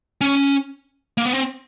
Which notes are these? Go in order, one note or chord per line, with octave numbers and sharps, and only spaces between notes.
C#4
A#3
B3
C4